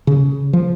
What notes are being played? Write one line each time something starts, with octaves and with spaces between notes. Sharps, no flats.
C#3
F3